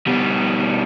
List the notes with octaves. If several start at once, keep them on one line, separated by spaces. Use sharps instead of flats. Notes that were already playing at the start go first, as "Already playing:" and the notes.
B2 G3